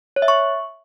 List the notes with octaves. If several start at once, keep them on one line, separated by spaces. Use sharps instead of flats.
C#5
E5
C#6